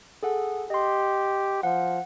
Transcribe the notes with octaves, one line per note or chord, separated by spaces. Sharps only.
G#4 A4 F#5
G4 D#5 C6
F3 F#5